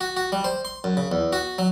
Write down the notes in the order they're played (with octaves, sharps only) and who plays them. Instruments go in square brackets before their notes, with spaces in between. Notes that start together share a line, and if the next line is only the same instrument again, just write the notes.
[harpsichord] F#4
F#4
G3
C5
C6
F#2
C#3
E2
F#4
F#3